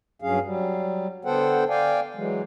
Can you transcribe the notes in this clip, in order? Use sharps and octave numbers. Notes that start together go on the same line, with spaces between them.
G2 F#3 C#4 G#4 F5
F#3 G3
D3 B3 A4 C5 F#5 G5
D5 F5 G5 G#5
E3 F#3 G#3